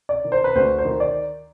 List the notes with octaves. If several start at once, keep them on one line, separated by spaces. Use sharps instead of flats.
D5
D#3
C5
B4
D2 C5
C5
D#3
D5